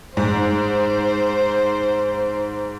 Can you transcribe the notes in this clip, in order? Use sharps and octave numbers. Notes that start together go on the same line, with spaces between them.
G#2 C5